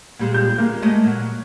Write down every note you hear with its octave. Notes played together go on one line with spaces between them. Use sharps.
A#2 G3 G#3
G6
G#3 A#3
G#3 A3 D#5
A#2 F#3